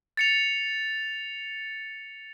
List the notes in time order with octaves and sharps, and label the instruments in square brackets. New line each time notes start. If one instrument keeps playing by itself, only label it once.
[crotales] A6 C#7 F7